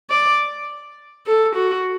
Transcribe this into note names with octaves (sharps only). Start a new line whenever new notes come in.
D5
A4
F#4